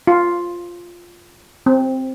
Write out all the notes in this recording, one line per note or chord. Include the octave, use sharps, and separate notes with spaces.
F4
C4